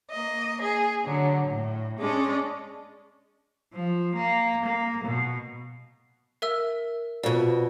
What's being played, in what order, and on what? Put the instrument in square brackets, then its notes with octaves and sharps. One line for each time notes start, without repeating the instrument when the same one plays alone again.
[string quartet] A#3 D#5
G#4
D3 F#3
A2
G#3 C#4 D4 D5
[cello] F3
A#3
A#3
B2
[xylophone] A#4 E5 E6
[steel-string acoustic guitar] F2 B2 [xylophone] D5